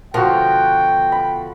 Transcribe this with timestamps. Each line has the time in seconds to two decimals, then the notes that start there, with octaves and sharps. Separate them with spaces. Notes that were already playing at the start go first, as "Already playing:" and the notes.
0.14 B2 D3 F3 F#4 A#4 G5
1.12 B5